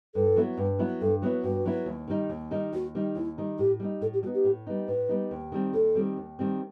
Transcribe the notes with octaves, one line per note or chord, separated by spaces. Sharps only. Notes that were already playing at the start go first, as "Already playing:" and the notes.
G2 A4
F#3 B3 E4
G2
F#3 B3 E4
G2 A4
F#3 B3 E4
G2 F#4
F#3 B3 E4
D#2
D#3 G3 D#4
D#2
D#3 G3 D#4
D#2 F#4
D#3 G3 D#4
D#2 E4
D#3 G3 D#4
A2 G4
G3 B3 D#4
A2 A4
G4
G3 F#4
B3 D#4
G4
A2
G3 B3 D#4
A2 B4
G3 B3 D#4
D#2
D#3 G3 C4
D#2 A4
D#3 G3 C4
D#2
D#3 G3 C4